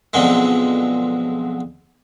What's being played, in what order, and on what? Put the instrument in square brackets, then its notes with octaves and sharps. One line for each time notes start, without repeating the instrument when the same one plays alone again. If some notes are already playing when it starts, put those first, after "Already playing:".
[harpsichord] B1 F2 D3 G#3